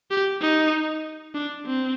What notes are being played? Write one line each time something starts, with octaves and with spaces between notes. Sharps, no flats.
G4
D#4
D4
C4